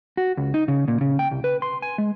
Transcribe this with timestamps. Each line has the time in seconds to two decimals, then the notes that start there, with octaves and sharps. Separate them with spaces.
0.17 F#4
0.37 C#2
0.54 D#4
0.68 C#3
0.88 A#2
1.01 C#3
1.19 G5
1.31 C2
1.44 B4
1.62 C6
1.82 G#5
1.98 G#3